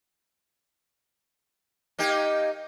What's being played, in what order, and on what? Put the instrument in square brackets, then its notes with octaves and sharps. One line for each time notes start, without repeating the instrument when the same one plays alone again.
[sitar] A#3 D#4 G4